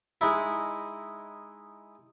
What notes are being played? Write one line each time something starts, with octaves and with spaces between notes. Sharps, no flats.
G#3 D#4 E4